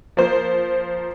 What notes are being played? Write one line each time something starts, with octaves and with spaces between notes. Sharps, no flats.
F3 A#3 C5